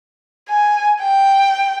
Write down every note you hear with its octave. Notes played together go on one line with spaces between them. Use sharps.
G#5
G5